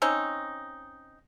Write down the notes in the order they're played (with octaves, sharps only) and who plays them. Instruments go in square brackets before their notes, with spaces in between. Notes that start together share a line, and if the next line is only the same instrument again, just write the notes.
[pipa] C4 C#4 D#4